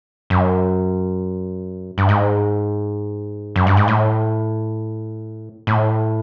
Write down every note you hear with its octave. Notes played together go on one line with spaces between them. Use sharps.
F#2
G2
G#2
F#2
G2
G#2
A2
A2